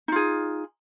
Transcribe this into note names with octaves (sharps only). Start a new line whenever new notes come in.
D#4 F4 G#4